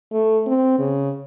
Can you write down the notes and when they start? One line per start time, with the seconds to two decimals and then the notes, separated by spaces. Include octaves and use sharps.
0.12 A3
0.46 C4
0.79 C#3